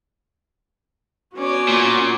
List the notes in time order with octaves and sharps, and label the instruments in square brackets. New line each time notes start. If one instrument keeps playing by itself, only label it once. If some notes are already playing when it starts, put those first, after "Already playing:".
[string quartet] B3 C#5 D5 [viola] C#4 F#4
[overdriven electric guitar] A#2